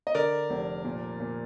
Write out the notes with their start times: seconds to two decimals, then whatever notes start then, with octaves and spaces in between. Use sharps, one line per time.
0.07 D#5
0.15 D3 A#4 D5
0.50 F1
0.85 A#2
1.20 A#2